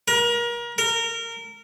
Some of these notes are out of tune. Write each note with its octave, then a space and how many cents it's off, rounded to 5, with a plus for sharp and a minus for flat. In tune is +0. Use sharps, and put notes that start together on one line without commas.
A#4 +30
A#4 -20